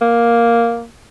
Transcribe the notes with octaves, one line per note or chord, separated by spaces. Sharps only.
A#3